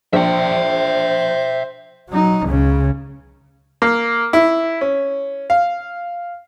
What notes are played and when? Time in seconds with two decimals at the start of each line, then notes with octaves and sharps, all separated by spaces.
0.13 A#1 C5 E5 G5
2.10 F#3 D#4
2.46 C#2 C#3
3.82 A#3
4.33 E4
4.81 C#4
5.50 F5